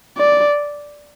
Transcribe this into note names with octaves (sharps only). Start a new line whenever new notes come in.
D5